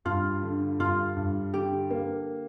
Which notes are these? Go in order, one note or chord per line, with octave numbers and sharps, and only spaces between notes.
G2 F4
D3
G2 F4
G2
D3 G4
A#3